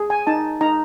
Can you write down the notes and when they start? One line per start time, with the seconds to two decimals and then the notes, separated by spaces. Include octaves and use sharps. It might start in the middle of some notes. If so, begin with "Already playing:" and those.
Already playing: G#4
0.10 G#5
0.27 D#4 A5
0.61 D#4 A#5